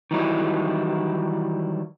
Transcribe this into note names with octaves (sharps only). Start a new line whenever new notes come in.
D#3 E3 F#3 G3 D#4 E4